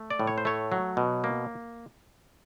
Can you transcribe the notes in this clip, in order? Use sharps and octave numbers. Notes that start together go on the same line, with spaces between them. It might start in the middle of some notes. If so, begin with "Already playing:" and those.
Already playing: A3
D5
A2
C#5
C5
A3 C#5
F#3
B2
A#3